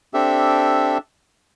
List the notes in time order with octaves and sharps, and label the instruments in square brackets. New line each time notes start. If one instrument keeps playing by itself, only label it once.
[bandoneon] C4 D4 G4 A4 E5